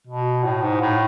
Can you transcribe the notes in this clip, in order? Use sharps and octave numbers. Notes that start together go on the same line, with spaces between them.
B2
A2
G#2
A2